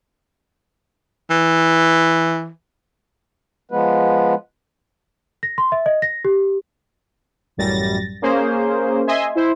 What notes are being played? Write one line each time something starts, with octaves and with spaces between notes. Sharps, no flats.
E3
F3 G#3 B3 B4
A#6
C6
E5
D#5
A#6
G4
A1 F#2 G3 A6 A#6
A#3 C#4 G#4 C5
D#5 E5 G#5 C6
E4 C5